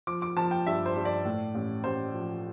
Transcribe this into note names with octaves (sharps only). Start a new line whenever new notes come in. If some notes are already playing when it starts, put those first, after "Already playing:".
F3 D6
D6
F3 A5
G5
G2 E5
C5
G2
D5
A2
A1
A1 C5
F3